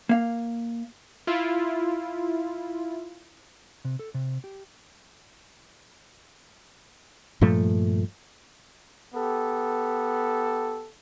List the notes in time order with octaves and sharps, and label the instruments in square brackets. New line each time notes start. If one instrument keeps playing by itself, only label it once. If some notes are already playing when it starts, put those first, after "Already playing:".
[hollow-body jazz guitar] A#3 F5
[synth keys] E4 F4
[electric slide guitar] C3
A4
C3
G4
[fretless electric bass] G2 A#2 F3 A3
[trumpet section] B3 G4 A4